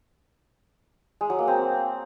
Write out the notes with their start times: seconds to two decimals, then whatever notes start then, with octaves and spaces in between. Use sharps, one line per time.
1.21 G#3
1.30 F#3
1.39 A#3
1.48 C4